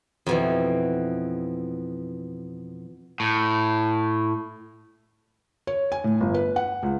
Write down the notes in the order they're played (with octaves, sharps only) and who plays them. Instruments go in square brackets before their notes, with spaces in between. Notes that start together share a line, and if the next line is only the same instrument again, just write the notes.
[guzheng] F2 B2 E3
[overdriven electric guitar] A2
[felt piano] C#5
G#5
A2
G1
B4
F#5
C#2